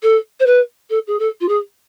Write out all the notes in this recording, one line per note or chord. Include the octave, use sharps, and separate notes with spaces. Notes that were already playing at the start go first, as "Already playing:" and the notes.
A4
C5
B4
A4
G#4
A4
F4
G#4